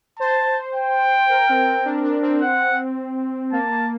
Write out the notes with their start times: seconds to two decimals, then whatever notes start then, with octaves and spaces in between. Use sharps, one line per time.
0.19 C5 A5
0.75 G5
1.30 A#4
1.49 C4
1.67 C4
1.85 D4
2.04 D4
2.23 C4
2.41 F#5
3.52 A#3 A5
3.71 A#3